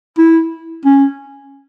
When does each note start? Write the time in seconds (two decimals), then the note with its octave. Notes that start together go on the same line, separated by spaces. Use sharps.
0.18 E4
0.86 C#4